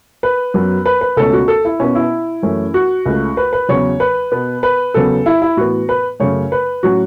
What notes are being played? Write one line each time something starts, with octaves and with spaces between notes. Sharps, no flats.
B4
F#2 F#3 B3
B4
B4
C#2 B2 A3 C#4 A4
F#4
A4
E4
B2 B3 C#4
E4
F#2 E3 A3 C#4
F#4
C#2 C#3 A3
B4
B4
E2 C#3 F#3 C#5
B4
B2 B3
B4
E2 C#3 F#3 B3 A4
E4
E4
A2 E3 B3 F#4
B4
F#2 C#3 A3 C#5
B4
A2 F#3 C#4 F#4